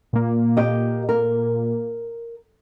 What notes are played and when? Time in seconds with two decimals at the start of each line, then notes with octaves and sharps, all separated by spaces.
0.13 A#2 A#3
0.57 G4 D#5
1.09 A#4